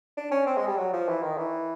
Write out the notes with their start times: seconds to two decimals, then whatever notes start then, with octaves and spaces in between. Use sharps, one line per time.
0.17 D4
0.32 C#4
0.47 C4
0.57 G#3
0.67 G3
0.78 F#3
0.93 F3
1.08 E3
1.23 D#3
1.37 E3